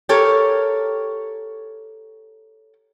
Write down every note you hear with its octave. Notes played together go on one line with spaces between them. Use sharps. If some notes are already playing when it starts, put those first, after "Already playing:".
G4 A4 A#4 C#5